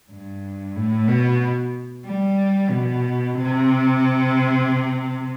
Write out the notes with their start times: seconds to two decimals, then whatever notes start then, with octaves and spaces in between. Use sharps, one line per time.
0.12 G2
0.76 A2
1.08 B2
2.06 G3
2.70 B2
3.34 C3